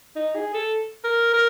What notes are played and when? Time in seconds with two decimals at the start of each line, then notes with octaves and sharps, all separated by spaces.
0.15 D#4
0.35 G#4
0.54 A4
1.04 A#4
1.33 A#4